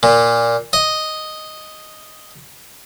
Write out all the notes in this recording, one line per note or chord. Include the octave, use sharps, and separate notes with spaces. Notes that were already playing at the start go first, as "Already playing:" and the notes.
A#2
D#5